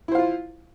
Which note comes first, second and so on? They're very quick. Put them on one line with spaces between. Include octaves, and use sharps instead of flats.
E4 C5 F5 F4